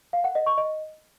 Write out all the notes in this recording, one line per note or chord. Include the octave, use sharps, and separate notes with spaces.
F5
F#5
D#5
C#6
D#5